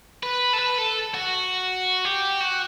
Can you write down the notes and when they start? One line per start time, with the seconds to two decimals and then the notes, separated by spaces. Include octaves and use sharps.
0.23 B4
0.53 A4
0.59 B4
0.78 A4
1.14 F#4
2.05 G4
2.41 F#4